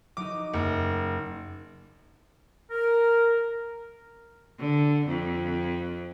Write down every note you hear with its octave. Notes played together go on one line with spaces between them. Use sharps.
F#3 D#4 D6
F#1
A#4
D3
F2